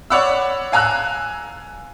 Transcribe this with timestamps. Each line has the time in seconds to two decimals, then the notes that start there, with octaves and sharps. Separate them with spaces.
0.10 C#5 D5 F#5 B5 E6
0.72 F5 G#5 A#5 E6 F#6